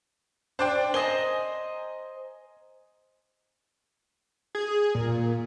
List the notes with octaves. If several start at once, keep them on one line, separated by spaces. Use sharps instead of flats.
D4 C5 D5 G5
C5 D#5 G#5 A#5 G7
G#4
A#2